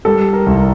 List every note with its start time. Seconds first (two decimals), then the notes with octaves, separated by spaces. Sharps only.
0.05 G3 A4
0.33 A#4
0.46 C2